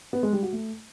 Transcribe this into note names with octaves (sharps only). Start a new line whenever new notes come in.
B3
G#3
G3
F#4
A3